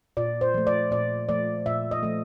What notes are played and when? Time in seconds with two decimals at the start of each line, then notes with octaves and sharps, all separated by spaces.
0.17 A#2 D5
0.41 C5
0.54 F3 A3
0.67 D5
0.91 A#2 D5
1.29 F3 A3 D5
1.66 A#2 E5
1.91 D#5
2.03 F3 A3